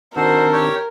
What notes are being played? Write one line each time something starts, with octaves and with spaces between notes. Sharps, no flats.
D#3 C4 D4 F#4 A4 A#4 C5
G4 C#5